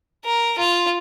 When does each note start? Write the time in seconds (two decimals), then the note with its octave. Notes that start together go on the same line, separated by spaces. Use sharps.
0.25 A#4
0.59 F4